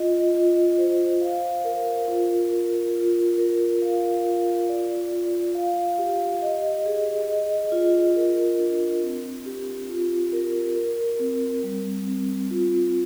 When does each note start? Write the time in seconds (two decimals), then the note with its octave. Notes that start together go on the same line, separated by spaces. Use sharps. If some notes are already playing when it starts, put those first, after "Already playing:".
Already playing: F4 D#5
0.34 F4
0.78 C5
1.21 F5
1.65 A#4
2.08 F4
2.51 A#4
2.95 F4
3.38 A#4
3.82 F5
4.25 F4
4.69 D5
5.12 F4
5.55 F5
5.98 G4
6.42 D#5
6.86 G#4
7.29 D#5
7.72 F4
8.17 A#4
8.59 D4
9.03 C4
9.46 G4
9.89 F4
10.33 A#4
10.76 A#4
11.19 C4
11.63 G3
12.07 C4
12.51 F4